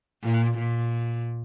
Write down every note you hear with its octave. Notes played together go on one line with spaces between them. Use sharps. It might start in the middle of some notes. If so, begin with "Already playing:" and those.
A#2
A#2